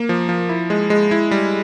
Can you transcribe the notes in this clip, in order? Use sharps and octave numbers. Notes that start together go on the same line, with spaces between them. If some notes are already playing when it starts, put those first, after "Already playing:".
Already playing: A#3
F3
F3
E4
G#3
G#3
E4
G3